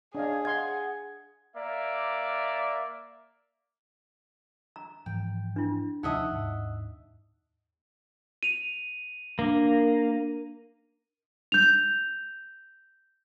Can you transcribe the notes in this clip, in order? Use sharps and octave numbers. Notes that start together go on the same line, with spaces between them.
D4 G#4 C#5 D#5 F5
D#5 F5 F#5 C6 G#6
A#3 D5 E5
A#5
G#2 E3 F3 G5
D4 E4
D#2 C3 F3 D#4 D#5 E5 F#5 A5
D#2 G#2 D4
D#7 F7
A#3 D4 A#4
G6 F7